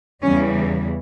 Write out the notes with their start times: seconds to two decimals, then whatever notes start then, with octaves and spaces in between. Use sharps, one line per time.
0.23 E2 C#3 E3 G3 C#4